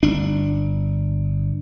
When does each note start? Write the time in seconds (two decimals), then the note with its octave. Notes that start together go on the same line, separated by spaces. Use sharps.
0.03 G1 D4